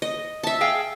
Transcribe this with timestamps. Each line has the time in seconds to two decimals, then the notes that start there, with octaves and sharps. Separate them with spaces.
0.02 D#5
0.43 E5 A5
0.61 G#4 F5 G5